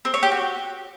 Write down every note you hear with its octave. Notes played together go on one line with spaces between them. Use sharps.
C4
C#5
G4
F#4